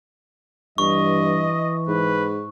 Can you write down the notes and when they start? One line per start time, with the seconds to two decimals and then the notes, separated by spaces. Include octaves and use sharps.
0.78 G2 E3 D#5 C#6
1.88 G#2 B4